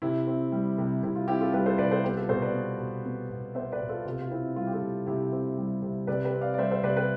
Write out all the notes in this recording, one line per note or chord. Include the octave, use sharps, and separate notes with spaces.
C3 E4
C4
G3
C3
C3 E4
F4
C4 E4 G4
F4 A4
G3 G4 B4
A4 C5
C3 B4 D5
A4 C5
B3 G4 B4
F4 A4
B2 A4 C5
B4 D5
B3
B2
B3
B2
B3 C5 E5
B4 D5
B2
F4 A4
C3 F4
F4
C4 E4
G3 F4
G4
F4 A4
C3
C3 E4 G4
C4
G3
C3
C3 B4 D5
G4 B4
C4
D5 F5
D5
G3 C5 E5
C5 E5
C3 B4 D5
G4 B4